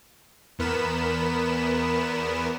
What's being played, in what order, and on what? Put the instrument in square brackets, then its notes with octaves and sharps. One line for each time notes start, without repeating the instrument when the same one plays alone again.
[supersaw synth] E2 B3 A#4 B5 E7